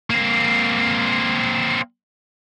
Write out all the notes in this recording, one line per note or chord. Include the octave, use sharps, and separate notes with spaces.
A#3 C4